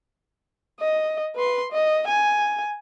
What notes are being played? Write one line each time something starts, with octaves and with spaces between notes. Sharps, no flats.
D#5
B4 C6
D#5
G#5